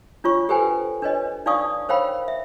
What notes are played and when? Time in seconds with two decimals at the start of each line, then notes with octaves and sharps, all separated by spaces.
0.24 D4 F4 C#5 C#6
0.49 G4 A4 B4 C5 G5 G#5
1.02 D4 B4 C#5 D#5
1.46 D4 D#4 D5 F5 C#6 D#6
1.89 A#4 C5 C#5 F5 G5 B5
2.28 E5